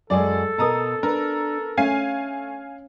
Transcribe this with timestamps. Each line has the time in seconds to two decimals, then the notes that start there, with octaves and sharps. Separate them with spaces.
0.10 F#2 G#3 G#4 A4 D5
0.58 B2 A#4 A5 A#5 D#6
1.03 D4 A#4 B4
1.77 A3 C#4 F5 G#5 C7